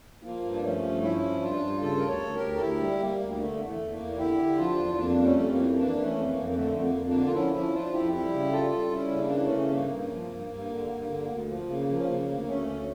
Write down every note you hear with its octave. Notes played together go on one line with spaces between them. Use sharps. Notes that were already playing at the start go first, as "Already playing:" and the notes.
F3 A#3
G2
D4
F3 A3 C#4
G2
F3 C#4 E4
G2
G2 D4 F4
G2
C#3 F4 A4
D2 A#4
A4 C#5
D2
G4 A#4
D2
A4
D2 E4 G4
G3
G3 A#3
D2
D3 A3
E2
A3
E2
A#3
E2
D3 E4 G4
D3
F3 D4 F4
E2
F2 A#3 D4
G3 A#3
A3 C#4
F2
A#3
E3
E3 A#3 D4
E3
A3 C#4
F2
A#3
F2
A#3
D3 A3
F2 A3
A#3
F2
A#3 D4
D3
F4
F3 C#4 E4
F3 C#4 E4
F3 D4 F4
F2 E4 G4
G3 E4 G4
C#3
G3 F4 A4
G3
G3 C#4 E4
C#3
A#3 D4
E3
A3 C#4
C#3
G2 A#3
G2
F3
G2
G2
D3
G2
D3
D2
F3
C#3 A#3
F3
C#4
C#3 A#3
D2
D2 A3 C#4
D2